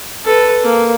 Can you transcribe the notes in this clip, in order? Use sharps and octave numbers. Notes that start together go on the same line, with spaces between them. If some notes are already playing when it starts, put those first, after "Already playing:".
A4 B4
A#3